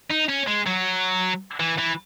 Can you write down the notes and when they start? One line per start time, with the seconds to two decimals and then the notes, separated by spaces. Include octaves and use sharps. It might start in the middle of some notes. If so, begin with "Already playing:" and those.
0.11 D#4
0.29 C#4
0.48 G#3
0.67 F#3
1.60 E3
1.78 E3